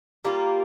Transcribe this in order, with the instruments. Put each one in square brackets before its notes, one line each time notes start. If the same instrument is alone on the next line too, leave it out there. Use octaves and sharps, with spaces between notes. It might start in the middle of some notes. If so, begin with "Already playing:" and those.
[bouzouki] G3 A#3 F4